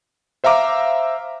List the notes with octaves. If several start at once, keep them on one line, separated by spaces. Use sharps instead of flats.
C5 E5 F5 A#5 D6